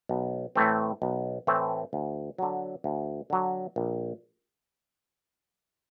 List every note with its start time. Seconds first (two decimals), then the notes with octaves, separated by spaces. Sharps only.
0.09 B1
0.56 A2 E3 A3 C4
1.02 B1
1.47 A2 E3 A3 C4
1.93 D2
2.38 D3 F#3
2.84 D2
3.30 D3 F#3
3.76 A#1